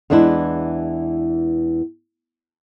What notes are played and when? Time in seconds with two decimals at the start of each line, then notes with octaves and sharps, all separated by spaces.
0.10 E2 E3 G#3 D4 E4